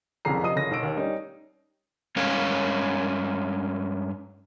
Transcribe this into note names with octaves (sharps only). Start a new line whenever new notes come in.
F#1 C2 F2 G#4 A#5 C7
C3 F3 D#5 D#6 D#7
F#1 C#3 A#6
B1 E6 D7
D#2
G3 C#4 D#4
G2 G#3 C#4 A#4 C#5 F5